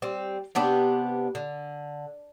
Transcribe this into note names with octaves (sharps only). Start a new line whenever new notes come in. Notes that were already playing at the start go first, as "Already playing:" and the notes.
G3 C4
C3 B3 D4 G4
D3